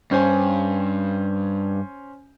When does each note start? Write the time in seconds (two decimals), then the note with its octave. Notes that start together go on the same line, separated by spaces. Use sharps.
0.11 G2 C#4 C5 G#5